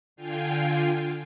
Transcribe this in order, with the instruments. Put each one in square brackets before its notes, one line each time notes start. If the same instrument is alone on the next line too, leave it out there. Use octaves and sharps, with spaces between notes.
[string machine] D3 F4 F5 G5 G#5